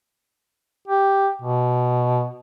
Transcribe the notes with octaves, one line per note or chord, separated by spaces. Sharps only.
G4
B2